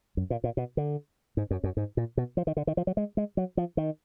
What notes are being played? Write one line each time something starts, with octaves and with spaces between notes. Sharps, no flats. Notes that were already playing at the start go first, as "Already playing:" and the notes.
F#2
A#2
A#2
B2
D3
G#2
F#2
F#2
G#2
A#2
B2
F3
D#3
D3
D#3
F3
F#3
G#3
G#3
F#3
F3
D#3